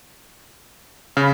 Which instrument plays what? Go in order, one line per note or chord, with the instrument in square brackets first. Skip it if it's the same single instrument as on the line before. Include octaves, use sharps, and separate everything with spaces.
[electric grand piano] C#3 [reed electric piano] F5 B5